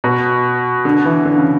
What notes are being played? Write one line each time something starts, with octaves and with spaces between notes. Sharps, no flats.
B2
D3
E3
D3
C#3